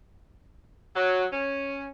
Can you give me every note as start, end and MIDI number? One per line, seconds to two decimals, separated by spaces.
0.94 1.24 54
1.32 1.87 61